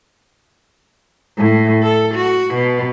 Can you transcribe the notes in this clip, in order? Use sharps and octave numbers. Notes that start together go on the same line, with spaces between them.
A2
A4
F#4
B2